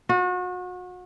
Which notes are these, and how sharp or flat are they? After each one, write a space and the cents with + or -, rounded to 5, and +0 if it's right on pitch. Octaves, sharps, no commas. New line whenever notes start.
F#4 -35